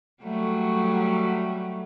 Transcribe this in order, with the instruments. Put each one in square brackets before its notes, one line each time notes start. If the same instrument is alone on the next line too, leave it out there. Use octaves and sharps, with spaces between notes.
[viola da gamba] F#3 G3 A3